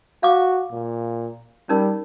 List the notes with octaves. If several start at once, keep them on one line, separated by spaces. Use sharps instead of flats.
F#4 F5 D6
A#2
G3 C#4 D#4 A#4